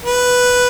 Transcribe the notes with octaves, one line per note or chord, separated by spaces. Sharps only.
B4